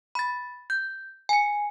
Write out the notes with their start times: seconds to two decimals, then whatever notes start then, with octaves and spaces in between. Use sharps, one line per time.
0.15 B5 A6
0.70 G6
1.29 G#5 C#7